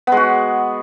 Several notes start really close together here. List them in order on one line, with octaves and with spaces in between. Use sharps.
B3 G#3 F#4